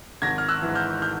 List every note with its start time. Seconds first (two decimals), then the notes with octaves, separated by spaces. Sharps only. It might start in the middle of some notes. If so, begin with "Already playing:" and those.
0.22 G#1 G#6 A#6
0.38 F6
0.48 E6 F#6
0.62 G#2 E3
0.75 F6 G6
1.02 F6 G6